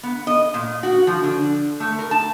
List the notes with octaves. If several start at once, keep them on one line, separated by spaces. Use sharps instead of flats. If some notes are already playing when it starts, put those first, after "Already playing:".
B3
D#5
A#2
F#4
F3
D3
A3
A#4
A5